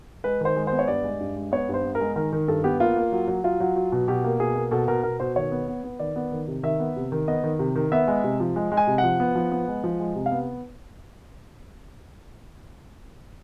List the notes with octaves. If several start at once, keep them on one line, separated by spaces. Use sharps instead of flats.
G#3 B4
D#3 C5
G#3
B3 C5
C#5
G2 D5
G#3
G2
G#3
B3 C#5
G2
C5
B3
A#4
G#3
D#3 A#4
D#3
G2 A4
B3 G4
A#3 F4
A#3
F#3
F#3
F#3 F4
F#3
F#3
B2
B2 G4
A#3
B2 G#4
A#3
B2 A4
B2 A#4
B2 A#4
B2 C5
D#3 C#5
B3
B3
B3
D#3 D5
B3
D#3
C3
D#3 E5
B3
C3
D#3
B3 D#5
D#3
C3
D#3
B3 E5
G#3
C3
F3
G#3
G#3
G#5
C3
F#5
F3
B3
F3
B3
G#3
F3
G#3
C3
F5
B3